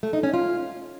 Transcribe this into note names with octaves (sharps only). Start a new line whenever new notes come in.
A3
D#4
C#4
F4